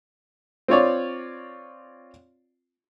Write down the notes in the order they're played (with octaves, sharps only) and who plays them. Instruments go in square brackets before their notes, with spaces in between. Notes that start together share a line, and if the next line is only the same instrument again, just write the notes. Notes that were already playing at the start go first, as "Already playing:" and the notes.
[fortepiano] C4 F4 C#5 D5